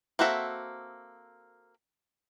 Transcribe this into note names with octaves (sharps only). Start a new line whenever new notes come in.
A#3 C4 F#4 A4 E5